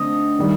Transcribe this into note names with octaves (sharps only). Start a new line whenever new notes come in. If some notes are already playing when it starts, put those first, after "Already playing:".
Already playing: D3 A3 C4 D#5
D#3 G3